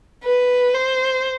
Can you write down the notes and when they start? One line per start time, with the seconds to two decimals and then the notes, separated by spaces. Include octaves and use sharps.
0.24 B4
0.74 C5